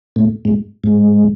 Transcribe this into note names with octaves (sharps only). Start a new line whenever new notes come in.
A2
G#2
G#2